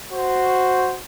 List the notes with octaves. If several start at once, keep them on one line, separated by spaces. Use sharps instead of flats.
F#4 C5